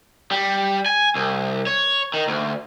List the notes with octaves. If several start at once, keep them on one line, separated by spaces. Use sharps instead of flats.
G3
G#5
C2
C#5
D#3
D2